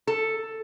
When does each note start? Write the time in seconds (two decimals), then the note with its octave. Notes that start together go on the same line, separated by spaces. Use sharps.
0.07 A4